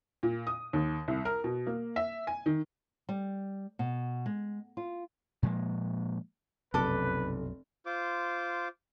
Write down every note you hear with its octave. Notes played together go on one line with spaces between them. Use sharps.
A#2
D#6
D#2
C2
A#4
B2
A#3
E5
G#5
D#3
G3
B2
G#3
F4
A#2 F3 G#3 A#3
F1 B1 F#2 A4 B4 D6
F4 C5 D6